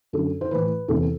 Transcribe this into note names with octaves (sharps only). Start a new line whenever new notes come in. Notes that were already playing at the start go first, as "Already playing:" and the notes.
F#2 D3 A4
C5
A2 E3 B4
E2 C3 E3 A4